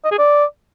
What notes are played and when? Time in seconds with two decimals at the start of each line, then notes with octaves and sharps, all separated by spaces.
0.04 D#5
0.11 G#4
0.18 D5